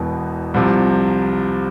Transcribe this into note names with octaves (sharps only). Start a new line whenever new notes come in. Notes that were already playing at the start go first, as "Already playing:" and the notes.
Already playing: E1 E2 B2 B3
C2 C3 F3